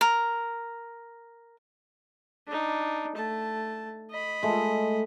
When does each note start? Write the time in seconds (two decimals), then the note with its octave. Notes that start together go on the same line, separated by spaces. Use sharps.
0.01 A#4
2.47 D4 D#4
3.15 A3 A5
4.10 D#5 B5
4.43 G#3 A3